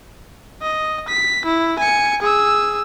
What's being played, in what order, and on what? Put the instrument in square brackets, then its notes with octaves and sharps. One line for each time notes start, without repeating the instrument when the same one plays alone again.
[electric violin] D#5
B6
E4
G#5 C#7
G#4 E6